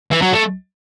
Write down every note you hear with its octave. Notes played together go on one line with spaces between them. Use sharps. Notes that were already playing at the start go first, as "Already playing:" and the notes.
E3
F#3
A3